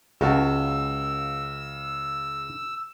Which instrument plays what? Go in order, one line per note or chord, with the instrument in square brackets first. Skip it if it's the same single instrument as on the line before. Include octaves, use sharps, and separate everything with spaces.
[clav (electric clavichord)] C#2 F#4 A5 [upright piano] C#3 [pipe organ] E6